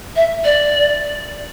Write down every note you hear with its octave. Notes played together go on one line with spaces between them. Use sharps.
E5
D5